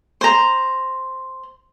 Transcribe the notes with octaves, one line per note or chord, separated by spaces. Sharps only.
C5 A#5